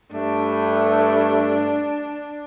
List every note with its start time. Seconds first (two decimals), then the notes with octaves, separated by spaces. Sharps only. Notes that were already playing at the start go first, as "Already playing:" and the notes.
0.13 G2 A3 D4